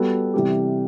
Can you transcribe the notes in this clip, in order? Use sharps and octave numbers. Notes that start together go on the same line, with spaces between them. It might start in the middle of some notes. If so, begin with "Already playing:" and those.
Already playing: G3 B3 F#4 A4
C3 E3 G3 C4 G4